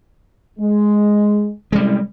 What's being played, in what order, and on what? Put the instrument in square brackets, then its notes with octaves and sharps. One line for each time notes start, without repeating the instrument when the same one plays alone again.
[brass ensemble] G#3
[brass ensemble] C2 A2 C#4 [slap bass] G3 G#3